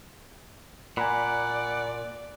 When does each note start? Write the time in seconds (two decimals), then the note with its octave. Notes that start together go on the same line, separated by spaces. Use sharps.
0.97 A#2 D5 F#5 G#5 A#5 B5